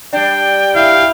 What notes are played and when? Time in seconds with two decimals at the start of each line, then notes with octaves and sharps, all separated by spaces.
0.13 G3 D4 G5
0.75 E4 F5